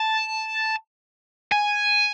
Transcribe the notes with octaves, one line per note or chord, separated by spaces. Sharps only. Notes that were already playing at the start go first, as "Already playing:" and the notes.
Already playing: A5
G#5